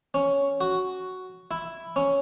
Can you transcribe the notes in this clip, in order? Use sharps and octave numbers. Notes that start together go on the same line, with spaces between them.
C#4
F#4
E4
C#4